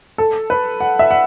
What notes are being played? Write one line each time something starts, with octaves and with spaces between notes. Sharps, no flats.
A4
B4
F#5
E5
F#5